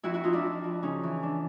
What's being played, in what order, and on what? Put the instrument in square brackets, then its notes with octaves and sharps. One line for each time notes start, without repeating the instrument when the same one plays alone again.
[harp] F2 E4 F#4
E4 F#4
F2 D#4 F4
D4 E4
F2
F2
C#3 C#4 D#4
E3
E2 D4